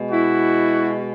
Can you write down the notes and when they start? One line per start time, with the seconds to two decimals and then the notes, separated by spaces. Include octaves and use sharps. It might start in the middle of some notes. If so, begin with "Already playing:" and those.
Already playing: B2 G#3
0.11 E4 F#4